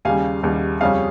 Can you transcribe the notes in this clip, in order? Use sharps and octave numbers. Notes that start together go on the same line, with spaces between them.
D#2 C#3 G3 F5 G#5
D#2 C#3 G3
F2 C#3 G3 C#4 F5 G#5